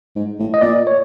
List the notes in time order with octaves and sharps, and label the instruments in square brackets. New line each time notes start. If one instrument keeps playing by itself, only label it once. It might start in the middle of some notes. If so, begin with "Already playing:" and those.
[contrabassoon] G#2
A2
[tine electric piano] D#5
[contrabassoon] A#2 [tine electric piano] D5
[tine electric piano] C#5